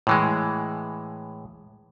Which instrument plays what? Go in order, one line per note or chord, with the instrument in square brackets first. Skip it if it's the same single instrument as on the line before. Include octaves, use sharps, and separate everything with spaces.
[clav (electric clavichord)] A2 E3 G#3